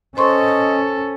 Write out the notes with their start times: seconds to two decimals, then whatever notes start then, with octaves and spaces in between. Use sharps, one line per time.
0.17 C#4 A4 C5 D#5 C6 C#6